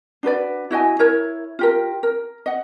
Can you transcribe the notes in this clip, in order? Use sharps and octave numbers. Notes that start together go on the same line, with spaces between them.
D4 F#4 B4 D5
E4 F#4 D#5 G#5
E4 A#4 C#5
F4 G4 A#4
A#4
D#5 F#5